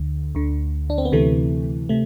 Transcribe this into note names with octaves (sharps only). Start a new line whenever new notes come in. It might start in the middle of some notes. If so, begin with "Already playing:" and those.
Already playing: D2 D3
D2 D3
D4
C4
B3
D2 C3 E3 A3
C3 A3